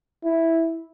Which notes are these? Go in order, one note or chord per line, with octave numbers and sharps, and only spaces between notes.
E4